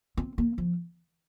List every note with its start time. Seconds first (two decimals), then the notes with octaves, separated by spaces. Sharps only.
0.17 C4
0.38 A#3
0.58 F3